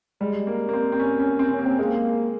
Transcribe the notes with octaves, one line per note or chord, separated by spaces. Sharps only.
G3 G#3
A#3
A#3
C4
C4
C#4
C#4
C4
C#4
A#3
C4
G#3 A#3